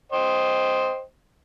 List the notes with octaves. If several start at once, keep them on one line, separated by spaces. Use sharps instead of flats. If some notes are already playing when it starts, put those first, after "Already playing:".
C5 D#5 G5